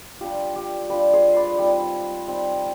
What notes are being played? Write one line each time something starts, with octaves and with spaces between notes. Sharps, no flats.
G3 D4 F4 G4
G4
G3 D4 F4 G4 B4
G#4 C5
B4 D5
G3 C4 D#4 G4 B4
G3 C4 D#4